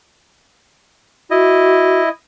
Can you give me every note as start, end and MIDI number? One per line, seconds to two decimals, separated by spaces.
1.31 2.09 64
1.31 2.02 66
1.31 2.09 75